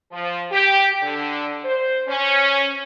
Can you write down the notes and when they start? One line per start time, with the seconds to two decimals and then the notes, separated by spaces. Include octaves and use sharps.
0.12 F3
0.52 G4
1.02 D3
1.64 C5
2.07 C#4